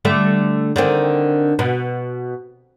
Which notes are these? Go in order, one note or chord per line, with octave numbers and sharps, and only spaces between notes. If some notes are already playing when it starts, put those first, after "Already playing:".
D3 G3 A3
D3 D#3 C4
B2